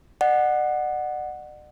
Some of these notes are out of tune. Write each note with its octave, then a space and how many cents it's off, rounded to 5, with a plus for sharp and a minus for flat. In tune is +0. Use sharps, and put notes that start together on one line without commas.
D5 +45 F#5 +0